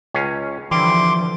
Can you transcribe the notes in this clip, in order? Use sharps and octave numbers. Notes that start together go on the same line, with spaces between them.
C#2 C#4 F5
D3 E3 F3 G3 C6 D6